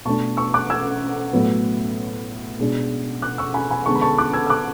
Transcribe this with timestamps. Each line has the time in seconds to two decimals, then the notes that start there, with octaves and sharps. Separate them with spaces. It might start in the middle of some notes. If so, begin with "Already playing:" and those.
0.05 B2 A3 D4 A5 C#6
0.37 C#6 E6
0.54 D6 F#6
0.70 E6 G#6
1.33 A2 F#3 B3
2.59 B2 G#3 D4
3.22 D6 F#6
3.38 C#6 E6
3.54 G#5 B5
3.70 G#5 B5
3.86 D3 G#3 B3 D4 A5 C#6
3.95 B5
4.02 A5 C#6
4.18 D6 F#6
4.33 E6 G#6
4.46 E6
4.50 D6 F#6